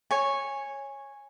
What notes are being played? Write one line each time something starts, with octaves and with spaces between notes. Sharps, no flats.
C#5 G#5